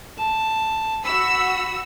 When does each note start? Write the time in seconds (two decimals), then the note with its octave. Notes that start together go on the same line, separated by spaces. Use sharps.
0.18 A5
1.05 F#4 B5 E6